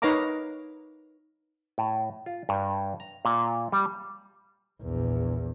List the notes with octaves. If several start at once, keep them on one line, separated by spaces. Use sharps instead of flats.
D#4 B4 C#5 F5 A#5 D6
A2
F4
G2
A#5
A#2
G3
A#1 E2